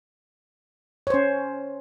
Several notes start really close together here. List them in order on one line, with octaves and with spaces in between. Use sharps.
C#5 C5 C#4